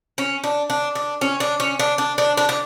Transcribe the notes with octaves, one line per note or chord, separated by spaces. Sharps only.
C#4
D4
D4
D4
C#4
D4
C#4
D4
D4
D4
D4
D4